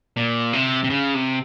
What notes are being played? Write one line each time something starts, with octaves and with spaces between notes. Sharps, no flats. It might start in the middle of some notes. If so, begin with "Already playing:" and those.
A#2
C3
C3
C#3
C3